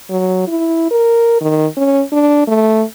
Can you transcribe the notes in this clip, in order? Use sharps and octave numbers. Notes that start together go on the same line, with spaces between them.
F#3
E4
A#4
D#3
C#4
D4
A3